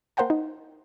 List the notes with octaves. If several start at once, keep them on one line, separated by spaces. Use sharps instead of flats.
A#3 A#4 C5 F#5 G5 A5
D#4